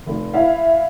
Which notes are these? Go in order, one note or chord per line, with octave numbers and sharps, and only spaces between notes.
F1
E4 E5 F5